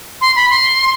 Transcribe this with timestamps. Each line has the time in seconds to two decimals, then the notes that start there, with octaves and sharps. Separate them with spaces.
0.21 C6
0.36 B5
0.50 C6